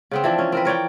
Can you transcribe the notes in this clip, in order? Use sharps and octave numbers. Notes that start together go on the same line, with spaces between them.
C#3 B3 C4
E3 F3 D4
C#4
C4 A#4 B4
A#4 C#5 D5 G5